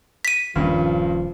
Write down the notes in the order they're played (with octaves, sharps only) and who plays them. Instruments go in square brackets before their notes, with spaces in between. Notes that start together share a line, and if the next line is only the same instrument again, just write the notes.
[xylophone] B6 D#7
[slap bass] D#1 D#3 C#4 [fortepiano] G2 A#2 [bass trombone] F3